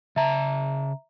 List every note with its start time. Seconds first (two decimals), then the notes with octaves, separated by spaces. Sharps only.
0.16 C#3 E5 A5 A#5